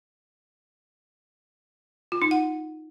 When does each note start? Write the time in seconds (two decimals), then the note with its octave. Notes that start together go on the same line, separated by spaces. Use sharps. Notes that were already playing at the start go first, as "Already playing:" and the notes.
2.12 F4
2.22 D#4
2.31 F#5